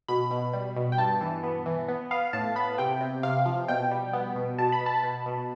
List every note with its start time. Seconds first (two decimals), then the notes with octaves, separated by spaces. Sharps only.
0.08 B2 B5
0.31 B2
0.53 G3
0.76 B2
0.92 G5
0.98 G2 A5
1.21 E3
1.43 B3
1.66 E3
1.88 B3
2.11 B3 F5
2.33 A2 A5
2.56 B3 B5
2.78 C3 G5
3.01 C3
3.23 C3 F5
3.46 F3
3.68 B2 G5
3.91 G3
4.13 B3
4.36 B2
4.58 B2 A5
4.72 B5
4.81 B2
4.86 A5
5.03 B2
5.26 B2